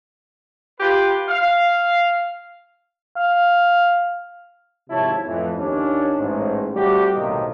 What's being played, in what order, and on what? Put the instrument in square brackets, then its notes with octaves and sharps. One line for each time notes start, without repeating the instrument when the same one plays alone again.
[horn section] F4 G4 B4
F5
[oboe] F5
[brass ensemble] G#1 C3 F3 E4 C#5 A5
F2 A2 E3
D#2 C#4 D4
A1 G#2
G3 A3 C4 F#4 G4
B1 A2 C3 D#3 A#3 D#5